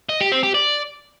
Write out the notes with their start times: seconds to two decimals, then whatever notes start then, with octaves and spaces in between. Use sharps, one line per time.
0.09 D#5
0.21 G4
0.32 C4
0.43 G4
0.54 D5